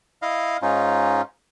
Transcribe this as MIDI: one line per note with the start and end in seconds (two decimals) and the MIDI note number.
0.22 0.57 64
0.22 0.57 75
0.22 0.57 77
0.62 1.21 44
0.62 1.21 61
0.62 1.21 63
0.62 1.21 65